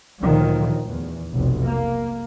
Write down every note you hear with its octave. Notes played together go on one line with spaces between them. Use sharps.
D2 A#2 D#3 F3 F#3
E2
F1 B1
A#3